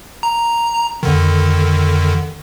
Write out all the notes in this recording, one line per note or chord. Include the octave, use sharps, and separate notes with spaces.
A#5
F2 D3 D#3